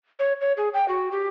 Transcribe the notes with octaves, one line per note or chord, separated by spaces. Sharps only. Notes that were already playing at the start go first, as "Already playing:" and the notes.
C#5
C#5
G#4
G5
F#4
G4